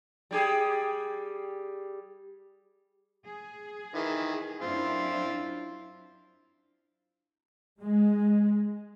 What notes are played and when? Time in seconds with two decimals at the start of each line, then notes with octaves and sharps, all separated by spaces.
0.31 G3 G4 G#4
3.25 G#4
3.95 D#3 E3
4.62 F#2 C4 D4 E4 F4
7.79 G#3